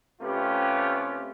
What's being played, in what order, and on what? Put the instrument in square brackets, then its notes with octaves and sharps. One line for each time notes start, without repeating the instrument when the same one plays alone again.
[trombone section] C3 A3 C#4 F4 G4 B4